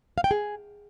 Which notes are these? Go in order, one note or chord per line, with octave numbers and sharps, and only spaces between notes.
F5
G5
G#4